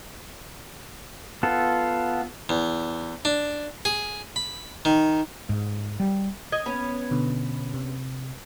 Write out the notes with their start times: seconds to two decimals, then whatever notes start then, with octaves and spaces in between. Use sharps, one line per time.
1.43 B3 F4 A4
2.49 E2
3.25 D4
3.85 G#4
4.36 B5
4.85 D#3
5.49 G#2
6.00 G3
6.52 D#5 G#6
6.66 B3 C#4
7.11 B2 D3
7.74 C3